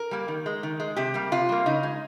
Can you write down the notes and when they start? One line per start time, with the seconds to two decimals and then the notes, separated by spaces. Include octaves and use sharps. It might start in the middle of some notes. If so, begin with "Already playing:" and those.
Already playing: A#4
0.11 G3 A#3
0.28 D#3
0.46 G#3
0.63 D#3
0.80 G#3
0.97 C3 G4
1.14 G3 A#3
1.32 C3 F4
1.49 G3 A#3
1.66 C#3 D#4
1.83 G#3